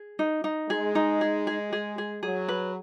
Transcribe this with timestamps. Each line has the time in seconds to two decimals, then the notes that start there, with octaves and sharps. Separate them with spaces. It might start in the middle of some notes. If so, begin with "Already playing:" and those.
Already playing: G#4
0.19 D#4
0.44 D#4
0.69 G#3 G#4
0.95 D#4
1.21 G#4
1.47 G#4
1.73 G#4
1.98 G#4
2.23 F#3 G#4
2.48 B4